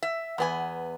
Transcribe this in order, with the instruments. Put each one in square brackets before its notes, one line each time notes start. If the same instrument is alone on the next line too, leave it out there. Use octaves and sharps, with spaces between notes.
[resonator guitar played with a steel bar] E5
E2 B3 G#5